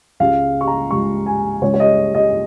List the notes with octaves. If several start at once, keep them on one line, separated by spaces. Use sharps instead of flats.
C#2 C#3 G#3 F5
C#6
A#5
C#2 C#3 G#3 C#6
G#5
C#2 C#3 G#3 C#5
C#5
D#5
D#5